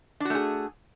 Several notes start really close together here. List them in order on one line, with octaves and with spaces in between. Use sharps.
D4 F#4 A3 G#4